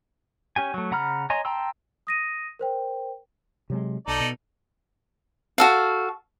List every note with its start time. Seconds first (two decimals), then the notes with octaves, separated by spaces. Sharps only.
0.56 C#4 G4 G#5
0.74 F#3 A3
0.91 C#3 F#5 A#5 B5 F6
1.30 C#5 D#5 G#5 A#5 C6
1.45 G5 A5 A#5 C6 E6
2.07 D#6 A#6 D#7
2.59 A#4 C5 G5
3.70 C3 F#3 G#3
4.08 B1 D#4 A4 D5
4.20 B2
5.58 F#4 A4 F5